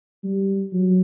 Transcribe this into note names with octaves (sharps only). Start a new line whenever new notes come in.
G3
F#3